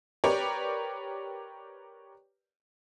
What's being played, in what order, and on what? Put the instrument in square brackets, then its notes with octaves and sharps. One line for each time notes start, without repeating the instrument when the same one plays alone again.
[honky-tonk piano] G4 A#4 B4 C#5 D5 G5